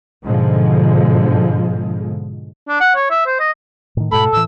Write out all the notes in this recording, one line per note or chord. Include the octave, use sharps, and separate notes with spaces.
G#2 B2 D3 F3 G#3
D4
F#5
C#5
E5
C5
D#5
A2 D#3
G#2 B2 A3 A4 B5
A2 E3 E6